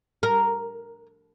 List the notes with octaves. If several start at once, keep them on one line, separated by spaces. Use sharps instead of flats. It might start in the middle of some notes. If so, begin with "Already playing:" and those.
A#4